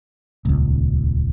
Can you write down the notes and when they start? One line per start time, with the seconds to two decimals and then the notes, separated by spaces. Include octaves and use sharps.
0.45 D#1 C#2